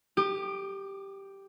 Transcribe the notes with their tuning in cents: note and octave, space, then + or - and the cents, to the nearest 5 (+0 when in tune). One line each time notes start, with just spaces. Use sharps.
G4 +0 D#6 -45